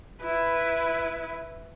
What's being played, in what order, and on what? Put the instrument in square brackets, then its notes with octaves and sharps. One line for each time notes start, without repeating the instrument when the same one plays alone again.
[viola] E4 B4